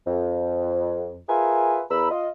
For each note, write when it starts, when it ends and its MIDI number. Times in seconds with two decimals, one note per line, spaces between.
0.07 1.20 41
1.29 1.82 65
1.29 1.82 68
1.29 1.82 70
1.29 1.82 71
1.29 1.82 76
1.29 1.82 80
1.90 2.09 40
1.90 2.09 70
1.90 2.09 83
1.90 2.09 88
2.11 2.29 65
2.11 2.29 75